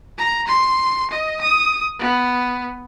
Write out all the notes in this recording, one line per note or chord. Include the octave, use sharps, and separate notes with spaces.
A#5
C6
D#5
D#6
B3